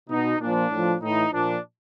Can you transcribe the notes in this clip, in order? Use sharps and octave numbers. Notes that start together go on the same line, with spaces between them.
B2 D#4
A#2 F3 D4
A2 F3
A2 E3 D#4
A#2 F3 D4